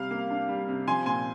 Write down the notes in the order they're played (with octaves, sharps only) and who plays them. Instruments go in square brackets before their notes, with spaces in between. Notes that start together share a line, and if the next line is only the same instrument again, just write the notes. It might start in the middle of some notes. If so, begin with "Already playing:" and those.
Already playing: [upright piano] C3 G3 F5
A#3
D4
G3
C3
F3 G#5 C6
A#2 G#5 C6